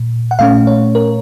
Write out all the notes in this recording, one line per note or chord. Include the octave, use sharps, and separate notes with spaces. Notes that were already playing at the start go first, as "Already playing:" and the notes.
Already playing: A#2
F#5
A#2 A3 C#4 F5
C#5
A#4